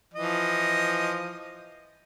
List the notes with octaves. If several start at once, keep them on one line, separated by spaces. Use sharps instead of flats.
E3 F3 D#5